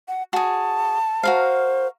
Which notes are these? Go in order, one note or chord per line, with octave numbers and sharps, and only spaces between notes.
F#5
F#4 G#4 A5
F#4 A#4 C5 F5